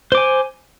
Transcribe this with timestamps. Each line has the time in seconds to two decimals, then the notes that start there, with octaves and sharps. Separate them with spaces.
0.12 C5
0.15 D6
0.17 G#5